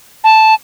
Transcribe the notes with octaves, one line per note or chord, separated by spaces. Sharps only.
A5